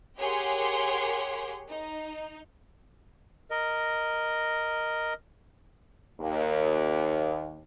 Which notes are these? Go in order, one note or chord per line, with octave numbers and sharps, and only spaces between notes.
G4 G#4 A#4 C#5 F#5 C6
D#4
A#4 D#5
D#2